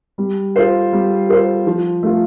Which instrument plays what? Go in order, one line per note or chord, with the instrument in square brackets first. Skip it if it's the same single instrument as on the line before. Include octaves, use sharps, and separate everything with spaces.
[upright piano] G3
F4 A4 C5
G3
F4 A4 C5
F3
A3 F4